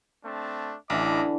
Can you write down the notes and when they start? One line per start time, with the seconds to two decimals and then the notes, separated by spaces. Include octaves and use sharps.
0.25 A3 C4 D4
0.90 A1 D3 E3 E4 D#5 D6